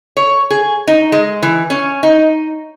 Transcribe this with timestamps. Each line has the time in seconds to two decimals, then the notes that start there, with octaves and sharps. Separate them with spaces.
0.17 C#5
0.50 G#4
0.87 D#4
1.12 G#3
1.43 E3
1.70 C#4
2.03 D#4